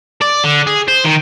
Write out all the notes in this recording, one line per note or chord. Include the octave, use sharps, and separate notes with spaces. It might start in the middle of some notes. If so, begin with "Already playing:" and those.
D5
D3
G#4
C5
D#3